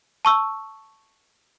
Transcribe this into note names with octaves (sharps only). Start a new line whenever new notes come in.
A5 C#6 E6